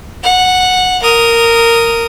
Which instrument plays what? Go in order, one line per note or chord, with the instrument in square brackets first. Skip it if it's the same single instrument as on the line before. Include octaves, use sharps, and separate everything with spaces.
[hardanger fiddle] F#5
A#4 D#6